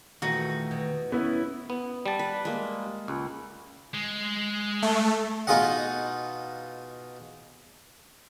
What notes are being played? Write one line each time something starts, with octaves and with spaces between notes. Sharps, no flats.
E2 A#2 D#3 A3 D#4 F#4
B2
B3 C#4 E4
B3
G3 A5
B4
G#3 A#3
C#2
G#3
A3
B2 D#4 F4 G#4 D#5 F#5